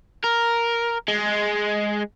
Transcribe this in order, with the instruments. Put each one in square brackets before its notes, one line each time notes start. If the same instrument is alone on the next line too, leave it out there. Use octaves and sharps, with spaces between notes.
[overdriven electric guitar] A#4
G#3